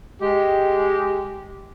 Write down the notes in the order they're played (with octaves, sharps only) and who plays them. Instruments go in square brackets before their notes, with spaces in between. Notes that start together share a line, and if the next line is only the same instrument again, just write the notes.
[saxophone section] G#3 G4